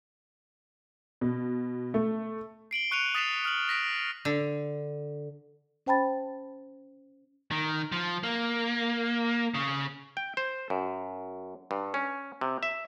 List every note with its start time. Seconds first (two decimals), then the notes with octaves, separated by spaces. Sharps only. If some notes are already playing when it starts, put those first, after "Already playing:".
1.21 B2
1.94 A3
2.71 C7 D7 F#7 G7
2.91 C#6 F#6 C#7 D#7 F7
3.15 D#6 A6 B6 C7 E7 F7
3.44 D#6 F6 C#7 F#7 G7
3.68 D#6 A#6 B6 D7
4.25 D3
5.86 C#4 C5 G5 A5 B5 A6
7.51 D#3
7.92 F3
8.23 A#3
9.54 C#3
10.17 G5
10.37 C5
10.70 F#2
11.71 G2
11.94 C#4
12.41 C3
12.63 E5